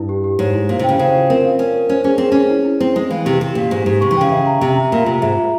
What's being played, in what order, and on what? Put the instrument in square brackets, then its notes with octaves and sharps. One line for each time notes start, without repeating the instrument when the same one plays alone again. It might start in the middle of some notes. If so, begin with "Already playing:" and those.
Already playing: [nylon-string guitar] G2 [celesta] E4
[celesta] G4
G4
[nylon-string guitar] G#2 [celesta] C#5
[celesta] E4
[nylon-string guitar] A#2 [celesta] C5
[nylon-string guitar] C3
[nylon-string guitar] C#3 [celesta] G5
[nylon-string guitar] C#3 [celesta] C5
[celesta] F4
[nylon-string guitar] C4 [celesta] A#4
[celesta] F5
[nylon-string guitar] C#4 [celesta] A#4
[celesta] A#4
[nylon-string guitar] C#4 [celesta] C5
[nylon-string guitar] C#4 [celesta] G#4
[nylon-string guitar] C4 [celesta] G#4
[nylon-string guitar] C#4 [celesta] G#4
[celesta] E4
E4
[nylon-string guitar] C4 [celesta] E4
[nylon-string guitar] G#3 [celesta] E4
[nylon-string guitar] E3 [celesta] F5
[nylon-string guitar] C3 [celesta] G4
[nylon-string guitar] C3 [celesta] G4
[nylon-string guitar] A#2 [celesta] G4
[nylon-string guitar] G#2 [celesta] G4
[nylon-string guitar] G#2 [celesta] G4
[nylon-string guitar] C3 [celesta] C#6
[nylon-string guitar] E3
[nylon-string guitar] C#3 [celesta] G5
[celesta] E5
A#5
[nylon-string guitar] C3 [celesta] E5
[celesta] A#5
[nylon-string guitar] A#2 [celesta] F4
[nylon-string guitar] C3 [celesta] A#5
[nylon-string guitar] G#2 [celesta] E5
[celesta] F4